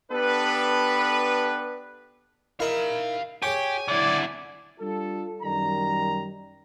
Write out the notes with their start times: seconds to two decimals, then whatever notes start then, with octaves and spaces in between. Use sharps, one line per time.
0.11 B3 D4 G4 A4 B4
2.60 D#4 E4 A#4 F5 B5
3.42 G4 G#4 C#5 G#5
3.88 D3 E4 D5
4.80 G3 D4 F4 A4
5.42 F#2 D#3 G3 A#5